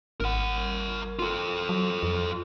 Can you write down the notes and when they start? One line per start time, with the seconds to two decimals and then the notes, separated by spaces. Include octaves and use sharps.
0.20 G#1 A#4 F#5
1.19 F4 A4
1.69 F#3
2.03 F2